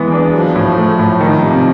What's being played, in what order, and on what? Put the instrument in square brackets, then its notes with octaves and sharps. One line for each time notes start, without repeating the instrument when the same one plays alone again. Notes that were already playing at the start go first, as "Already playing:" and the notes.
Already playing: [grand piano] E3 G#3 B3
D4
[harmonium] F3 [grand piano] F#3
[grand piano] A2
A3
A2
D#3
C3